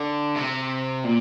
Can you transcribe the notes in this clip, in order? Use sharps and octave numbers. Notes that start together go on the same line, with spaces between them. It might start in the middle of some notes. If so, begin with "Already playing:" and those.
Already playing: D3
C3
A#2